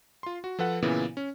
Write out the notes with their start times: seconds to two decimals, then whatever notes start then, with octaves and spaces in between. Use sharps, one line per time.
0.23 F4 C6
0.44 F#4
0.59 F3 A4 B4 F#5
0.82 A#2 C#3 E3 B3 E4
1.17 C#4